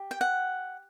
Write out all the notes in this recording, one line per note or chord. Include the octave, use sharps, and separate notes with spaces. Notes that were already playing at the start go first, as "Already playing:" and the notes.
Already playing: G4
G5
F#5